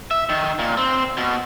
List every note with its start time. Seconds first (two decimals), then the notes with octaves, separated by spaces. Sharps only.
0.11 E5
0.29 D#3
0.59 A#2
0.77 C4
1.17 B2